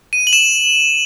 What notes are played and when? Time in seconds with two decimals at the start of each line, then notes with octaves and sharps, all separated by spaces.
0.13 D#7
0.27 F#7
0.33 E7